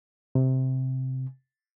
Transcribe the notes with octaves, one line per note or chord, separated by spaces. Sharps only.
C3